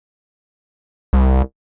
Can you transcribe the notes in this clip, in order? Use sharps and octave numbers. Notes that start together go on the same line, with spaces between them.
C2